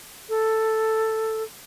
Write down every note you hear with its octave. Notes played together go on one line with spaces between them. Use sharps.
A4